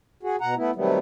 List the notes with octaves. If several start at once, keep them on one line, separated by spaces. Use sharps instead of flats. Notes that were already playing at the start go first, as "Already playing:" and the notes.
F#4 G#4
B2 F#5 A#5
A3 B3 E4
C3 D#3 F#3 G3 A3 B3